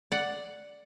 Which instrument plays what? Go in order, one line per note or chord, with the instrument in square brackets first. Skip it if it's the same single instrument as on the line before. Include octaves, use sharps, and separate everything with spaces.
[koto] D5 F#5